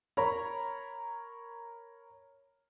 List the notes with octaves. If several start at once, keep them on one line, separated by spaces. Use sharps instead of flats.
A#4 C#5 A#5 B5